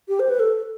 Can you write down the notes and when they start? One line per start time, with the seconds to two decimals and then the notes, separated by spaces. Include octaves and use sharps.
0.09 G4
0.20 C5
0.29 B4
0.39 A4